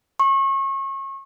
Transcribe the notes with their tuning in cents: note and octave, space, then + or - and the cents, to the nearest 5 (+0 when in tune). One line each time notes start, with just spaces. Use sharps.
C#6 -30